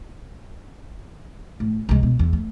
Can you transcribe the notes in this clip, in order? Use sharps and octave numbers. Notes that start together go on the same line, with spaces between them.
A2
C2 G#3
B2
E2
A3